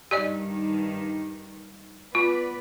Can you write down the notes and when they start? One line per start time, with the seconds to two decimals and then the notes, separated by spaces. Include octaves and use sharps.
0.11 G2 D#3 G4 D5 D#5
2.15 B3 F4 B4 D5